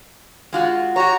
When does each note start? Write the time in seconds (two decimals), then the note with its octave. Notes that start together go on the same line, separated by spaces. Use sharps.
0.53 G#3 F4 F#4
0.96 F#4 G4 C#5 A#5